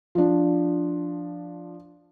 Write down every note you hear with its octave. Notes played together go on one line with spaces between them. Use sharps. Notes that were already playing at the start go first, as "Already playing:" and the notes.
F3 D4